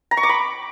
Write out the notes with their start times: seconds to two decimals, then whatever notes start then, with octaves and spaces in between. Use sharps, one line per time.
0.11 A#5
0.17 C#6
0.23 D6
0.29 B5